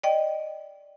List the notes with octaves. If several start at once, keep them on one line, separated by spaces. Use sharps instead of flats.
D5 D#5 G5